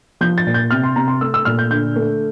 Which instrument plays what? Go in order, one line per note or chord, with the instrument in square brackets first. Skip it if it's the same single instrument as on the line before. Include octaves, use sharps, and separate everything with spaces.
[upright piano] F3 G6
A6
A#2
G6
C3 F6
C6
C3 A#5
C6
A3 E6
E6
A#2 F6
G6
D3 G6
A3